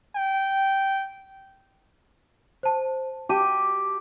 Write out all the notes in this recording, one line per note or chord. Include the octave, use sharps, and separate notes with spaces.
G5
C5 A5
G4 A5 D6 D#7